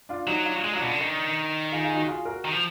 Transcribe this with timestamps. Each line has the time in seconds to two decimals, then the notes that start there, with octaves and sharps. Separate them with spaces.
0.09 D4 F4
0.27 F#3 D#4 F#4
0.45 D4 F4
0.64 G#3
0.73 F#3
0.76 D4 F4
0.82 B2
0.91 D3
1.00 D#3 D4
1.72 F4 G#4
1.84 F4 G#4
1.95 D#4 F#4
2.08 F4 G#4
2.25 F#4 A#4
2.45 D#3
2.53 F3